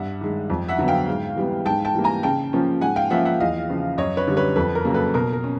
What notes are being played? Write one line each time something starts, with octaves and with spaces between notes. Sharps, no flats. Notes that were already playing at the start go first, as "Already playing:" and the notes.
Already playing: G2 E5 F#5
D#3 G#3
F2
E5 F#5
D3 F#3 B3
F5 G5
G#2
E3 G3 B3
G#2 G5 A5
G5 A5
E3 G3 A#3
G#5 A#5
C#3 G5 A5
F3 A#3 C#4
G#2 F#5 G#5
F5 G5
F3 A#3 C#4 E5 F#5
E5 F#5
E2 D#5 F5
C#3 F3
F#2 C#5 D#5
B4 C#5
D3 G3
B4 C#5
F2 A4 B4
A#4
C#3 F#3 A#3
A4 B4
B2 A#4
A#4
C#4